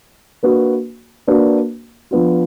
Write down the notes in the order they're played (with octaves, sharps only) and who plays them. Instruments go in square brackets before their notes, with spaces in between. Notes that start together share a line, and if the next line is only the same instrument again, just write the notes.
[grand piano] A#3 D4 F#4 B4
A#3 D4 F#4 B4
F3 B3 D4 F4